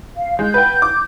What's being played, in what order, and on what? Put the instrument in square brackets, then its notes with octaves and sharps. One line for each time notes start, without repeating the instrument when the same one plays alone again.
[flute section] F5
[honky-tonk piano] G#3 [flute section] G6
[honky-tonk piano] B4 F#5 G5
D6